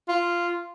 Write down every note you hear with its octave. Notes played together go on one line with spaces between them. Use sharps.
F4